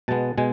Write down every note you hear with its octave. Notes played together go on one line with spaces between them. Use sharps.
B2 G#3 B3 A5
B2 G#3 G#5